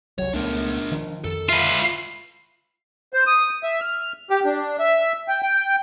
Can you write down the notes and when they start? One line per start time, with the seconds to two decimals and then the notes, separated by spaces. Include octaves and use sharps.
0.18 C2 F#3 C#5
0.34 C#2 A3 B3 D4 A#4
0.91 D#3 F3
1.24 F2 D#3 A4
1.49 F4 B4 E5 F5
3.14 C5
3.27 D#6
3.63 E5
3.81 F6
4.30 G4
4.45 D4
4.79 E5
5.28 G5
5.42 G5